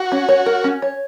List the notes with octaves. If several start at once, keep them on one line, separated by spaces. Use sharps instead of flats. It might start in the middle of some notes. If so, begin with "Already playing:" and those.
Already playing: F#4
C#4
C#5
A#4
C#4
C#5